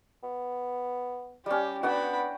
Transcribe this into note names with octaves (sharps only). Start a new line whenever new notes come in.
B3
G3 C#4 G4
B3 D4 F#4 F#5 G5 B5